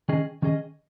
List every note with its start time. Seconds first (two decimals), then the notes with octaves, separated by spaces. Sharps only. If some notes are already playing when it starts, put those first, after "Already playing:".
0.09 D#3 C#4 G#4 D#5
0.42 D#3 C#4 G#4 D#5